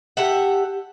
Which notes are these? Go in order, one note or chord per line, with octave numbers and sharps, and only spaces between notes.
G4 A4 E5 F#5